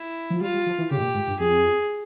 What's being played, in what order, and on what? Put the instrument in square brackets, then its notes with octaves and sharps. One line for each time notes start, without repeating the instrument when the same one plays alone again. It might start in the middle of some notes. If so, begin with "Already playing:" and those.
Already playing: [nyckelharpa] E4
[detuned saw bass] F3
[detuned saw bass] G3 [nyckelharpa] F4
[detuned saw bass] G3
F3
E3
[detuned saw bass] C#3 [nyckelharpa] G4
[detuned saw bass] G#2
A#2
G#2
G2
[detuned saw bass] F2 [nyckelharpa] G#4